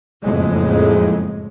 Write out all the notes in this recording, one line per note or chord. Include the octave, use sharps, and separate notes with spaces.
F#1 F2 A2 G#3